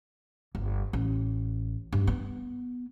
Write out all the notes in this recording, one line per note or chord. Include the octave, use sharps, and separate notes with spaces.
G1
A1
G2
B3